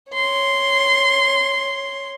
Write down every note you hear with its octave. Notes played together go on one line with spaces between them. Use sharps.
C#5 C6